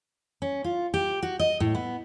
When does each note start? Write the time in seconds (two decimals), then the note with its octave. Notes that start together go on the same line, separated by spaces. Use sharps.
0.42 C#4
0.64 F4
0.94 G4
1.22 F#4
1.39 D#5
1.60 A2
1.75 B3